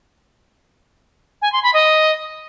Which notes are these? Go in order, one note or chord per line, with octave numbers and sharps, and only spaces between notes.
G#5
C6
B5
D#5